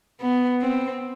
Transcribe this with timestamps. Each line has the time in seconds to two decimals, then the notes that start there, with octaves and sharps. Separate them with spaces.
0.21 B3
0.62 C4